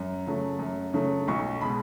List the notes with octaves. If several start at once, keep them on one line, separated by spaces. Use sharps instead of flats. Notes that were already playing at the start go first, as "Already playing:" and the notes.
Already playing: F#2
C#3 F#3 A3
F#2
C#3 F#3 A3
B1 C#6
B2 G#3 B5